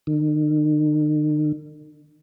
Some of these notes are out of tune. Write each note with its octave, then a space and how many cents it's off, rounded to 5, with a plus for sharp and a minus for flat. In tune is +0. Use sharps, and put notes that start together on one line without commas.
D#3 -45